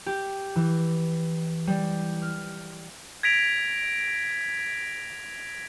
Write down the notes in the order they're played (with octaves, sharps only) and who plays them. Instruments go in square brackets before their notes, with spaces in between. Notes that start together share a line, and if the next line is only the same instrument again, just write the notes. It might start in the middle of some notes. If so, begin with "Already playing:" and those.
[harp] G4
E3
G3
F6
[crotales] G#6 A#6 B6 D7 F7